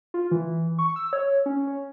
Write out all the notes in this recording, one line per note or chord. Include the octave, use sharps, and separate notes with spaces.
F4
E3
C#6
E6
C#5
C#4
C#4